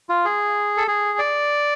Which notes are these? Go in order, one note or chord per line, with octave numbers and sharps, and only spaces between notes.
F4
G#4
A4
G#4
D5